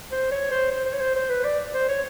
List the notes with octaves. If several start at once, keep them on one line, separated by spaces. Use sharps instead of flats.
C5
C#5
C5
C5
C5
C#5
C5
C5
B4
D5
C5
C#5